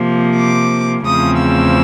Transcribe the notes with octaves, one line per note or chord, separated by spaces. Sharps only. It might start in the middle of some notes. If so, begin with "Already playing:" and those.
Already playing: C3 F3 A#3
D6
E2 C#3 F3 A3 C4 D#6
E6